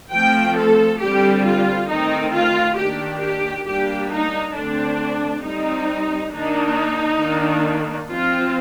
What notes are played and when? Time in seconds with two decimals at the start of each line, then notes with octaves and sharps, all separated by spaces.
0.12 F3 A3 C4 G5
0.56 A4
1.00 D3 G3 C4 G4
1.45 F4
1.88 D#3 A3 C4 D#4
2.33 F4
2.77 D#3 A#3 D4 G4
3.21 G4
3.66 G3 A#3 D4 G4
4.11 D#4
4.55 D3 A3 C4 D4
5.44 G3 C4 D#4
6.32 D#3 A#3 D4 D#4
7.21 D#3 A#3 D4
8.10 F3 C4 F4